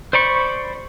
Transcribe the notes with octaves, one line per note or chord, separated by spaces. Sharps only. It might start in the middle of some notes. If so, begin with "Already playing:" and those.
C5 D5 B5 C#6